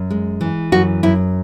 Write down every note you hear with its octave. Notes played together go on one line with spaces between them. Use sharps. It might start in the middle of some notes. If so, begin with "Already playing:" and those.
Already playing: F#2
G#3
E3
F#2 F#4
F#2 E4